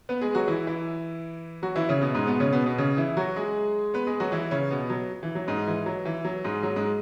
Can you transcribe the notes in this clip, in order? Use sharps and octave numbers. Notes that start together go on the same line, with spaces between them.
B3 B4
G#3 G#4
F#3 F#4
E3 E4
E3 E4
F#3 F#4
E3 E4
C#3 C#4
B2 B3
G#2 G#3
B2 B3
C#3 C#4
B2 B3
B2 B3
C#3 C#4
E3 E4
F#3 F#4
G#3 G#4
B3 B4
G#3 G#4
F#3 F#4
E3 E4
C#3 C#4
B2 B3
F#3
E3
F#3
G#2 G#3
E3
F#3
E3
F#3
G#2 G#3
F#3
G#2 G#3